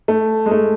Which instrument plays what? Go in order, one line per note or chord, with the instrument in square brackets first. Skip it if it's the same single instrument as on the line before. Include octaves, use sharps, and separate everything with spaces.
[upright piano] A3
G#3
A3